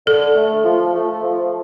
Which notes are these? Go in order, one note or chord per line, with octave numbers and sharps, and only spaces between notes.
D3 A4
A3
F3
A3
F3